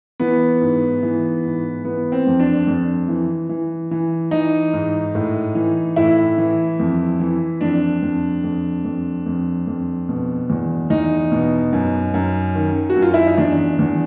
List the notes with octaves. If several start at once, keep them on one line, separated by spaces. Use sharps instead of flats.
E3 B3
G#2
E3
G#2
E3 B3
C4
F2
D4
F2
E3
E3
E3
E3 D#4
G#2
A2
E3
A2 E4
E3
F2
E3
F2 D4
F2
F2
F2
F2
F2
B2
E2
E2 D#4
B2
F#2
F#2
D#3
F#4
F#2
F4
E4
D#4
E2 D4
E2